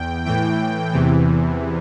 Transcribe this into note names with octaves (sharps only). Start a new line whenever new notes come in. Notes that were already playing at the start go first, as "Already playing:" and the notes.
Already playing: E2 G5
A2 E3 G5
E2 C3 E3